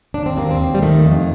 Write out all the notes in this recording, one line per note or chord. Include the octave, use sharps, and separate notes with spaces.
D#2 D4
C4
D#2 A#3
C4
D#2
G3
D#3 A3
F2